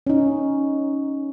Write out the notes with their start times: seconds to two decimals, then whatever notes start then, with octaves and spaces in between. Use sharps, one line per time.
0.07 C#4 D#4